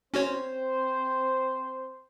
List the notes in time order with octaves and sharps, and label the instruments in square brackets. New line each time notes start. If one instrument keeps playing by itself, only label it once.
[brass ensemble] C4 C5 [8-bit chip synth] C#4 F#4 C#5